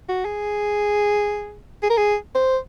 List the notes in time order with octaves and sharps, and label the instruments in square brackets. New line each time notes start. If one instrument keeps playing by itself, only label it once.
[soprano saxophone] F#4
G#4
G#4
A#4
G#4
C5